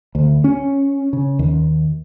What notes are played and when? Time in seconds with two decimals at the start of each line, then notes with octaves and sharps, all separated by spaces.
0.15 D2
0.44 C#4
1.13 C#3
1.39 D#2